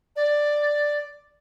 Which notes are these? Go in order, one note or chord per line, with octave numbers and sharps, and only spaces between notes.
D5